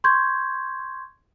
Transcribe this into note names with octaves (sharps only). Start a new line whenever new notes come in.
C6 C#6 G6 G#6